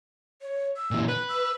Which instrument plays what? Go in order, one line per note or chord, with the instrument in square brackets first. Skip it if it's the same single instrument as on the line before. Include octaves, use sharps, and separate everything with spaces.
[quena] C#5
E6
[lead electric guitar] A#2 E3
[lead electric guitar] B4 [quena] F#6
[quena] E6